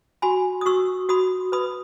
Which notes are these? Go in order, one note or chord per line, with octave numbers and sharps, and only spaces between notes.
F#4 G#5 B5
D#6
F#4 C#6 E6
F#4 B5 D#6
B4 B5 D#6